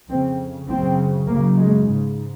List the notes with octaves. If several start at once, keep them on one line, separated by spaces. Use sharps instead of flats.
F2 C#3 C4
F#2 C#3 C4
F#2 C#3 A#3
G#3
G#2 C#3